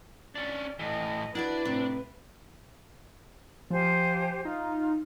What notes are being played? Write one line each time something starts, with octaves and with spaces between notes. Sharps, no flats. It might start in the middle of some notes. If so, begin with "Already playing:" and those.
C#4 D4 D5
A2 E3 D#5
D4 E4 F#4 B4 D5
A2 C3
F3 G4 C5 G#5
D#4 F4